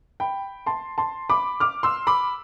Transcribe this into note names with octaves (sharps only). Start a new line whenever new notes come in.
G5 B5
A5 C6
A5 C6
B5 D6
D6 F6
C6 E6
B5 D6